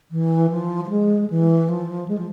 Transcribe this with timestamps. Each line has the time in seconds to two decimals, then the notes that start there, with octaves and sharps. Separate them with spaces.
0.11 E3
0.50 F3
0.84 F3
0.89 G#3
1.30 E3
1.69 F3
2.08 G#3
2.18 F3